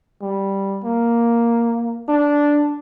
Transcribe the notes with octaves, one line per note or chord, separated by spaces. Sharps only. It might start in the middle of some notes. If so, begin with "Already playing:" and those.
G3
A#3
D4